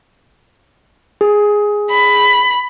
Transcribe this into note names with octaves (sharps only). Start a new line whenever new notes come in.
G#4
B5